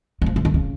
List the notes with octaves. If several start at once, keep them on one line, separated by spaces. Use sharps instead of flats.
E3
F3
E3
D#3
C#3